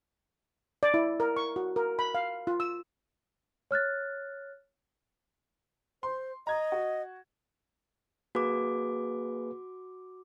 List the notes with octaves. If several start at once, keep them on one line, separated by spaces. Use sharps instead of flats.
D5
E4
A#4
C#6
F#4
A#4
B5
F5
F4
E6
C#5 F6 F#6 A6
C5 C6
D#5 A#5 G#6
F#4
A#3 F#4 G#4 B4 D6